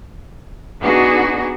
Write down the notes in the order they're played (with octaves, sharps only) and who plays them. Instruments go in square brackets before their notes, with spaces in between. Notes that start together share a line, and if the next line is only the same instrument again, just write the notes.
[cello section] B3 D4 D#4 F#4 G#4